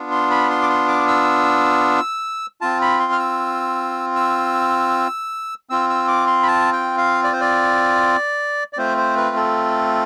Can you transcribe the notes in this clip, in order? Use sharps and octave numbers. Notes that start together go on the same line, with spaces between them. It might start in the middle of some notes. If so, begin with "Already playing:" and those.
Already playing: B3 D4 F4
C6
B5
C6
D6
C6
D6
E6
C4 F4 A5
B5
C6
F6
E6
E6
C4 F4 E6
E6
D6
C6
B5
A5
G5
F5
D5
C5
D5
D5
A3 C4 F4 C5
C5
B4
A4